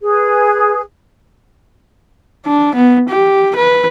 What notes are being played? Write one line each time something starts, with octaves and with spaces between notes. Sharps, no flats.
G#4 B4
D4
B3
G4
B4